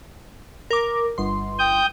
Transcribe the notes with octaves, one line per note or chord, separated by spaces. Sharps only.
A#4 D6
G1 C6
G5 D#6 G6